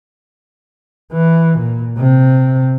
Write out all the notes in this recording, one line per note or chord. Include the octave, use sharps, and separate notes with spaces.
E3
A#2
C3